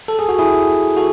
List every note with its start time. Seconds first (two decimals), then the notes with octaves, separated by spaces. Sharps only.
0.08 A4
0.19 G#4
0.29 F#4
0.39 E4 G#4
0.97 F#4 A4